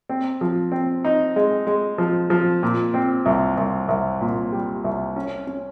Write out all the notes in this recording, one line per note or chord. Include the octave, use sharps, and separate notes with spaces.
C4
F3
C4
D#4
G#3
G#3
F3
F3
A#2
C4
C2
C2
C2
A#2
G3
C2
C#4
C#4